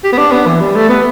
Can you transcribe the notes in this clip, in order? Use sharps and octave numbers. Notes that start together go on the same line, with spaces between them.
G4
B3
D4
B3
E3
G3
A3
B3